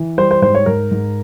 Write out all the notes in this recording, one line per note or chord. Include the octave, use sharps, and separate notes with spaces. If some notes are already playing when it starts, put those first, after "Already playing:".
Already playing: E3
G3 C5
C5
G#2 C5
C#5
G#2 A#4
G#2